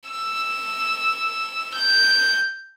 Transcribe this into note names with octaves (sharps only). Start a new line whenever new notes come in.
E6
G6